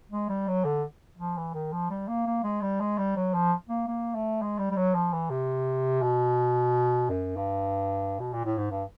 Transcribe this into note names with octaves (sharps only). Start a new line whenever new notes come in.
G#3
G3
F#3
D3
F3
E3
D#3
F3
G3
A#3
A#3
G#3
G3
G#3
G3
F#3
F3
A#3
A#3
A3
G#3
G3
G3
F#3
F3
E3
C3
B2
F#2
G2
B2
A#2
A2
G#2
G2